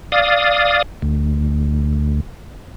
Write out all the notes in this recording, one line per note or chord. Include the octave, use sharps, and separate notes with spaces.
D5 F5 D#6
D2